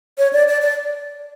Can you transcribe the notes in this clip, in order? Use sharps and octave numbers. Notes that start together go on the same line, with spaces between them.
C#5
D5
D5
D5